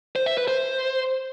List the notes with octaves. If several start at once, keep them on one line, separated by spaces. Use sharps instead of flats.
C5
E5
B4
C5